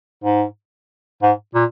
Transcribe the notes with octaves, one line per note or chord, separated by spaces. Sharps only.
G#2
G#2
A#2